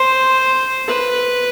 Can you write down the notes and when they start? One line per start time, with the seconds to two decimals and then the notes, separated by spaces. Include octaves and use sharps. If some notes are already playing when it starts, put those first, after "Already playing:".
Already playing: C5
0.88 B4